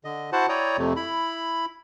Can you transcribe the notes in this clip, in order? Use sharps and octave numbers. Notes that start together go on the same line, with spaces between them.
D3 D#5
E4 F#4 C5 F#5 A5
E4 C#5 D5 G5 A#5 D#6
F2 C3 A3
E4 B5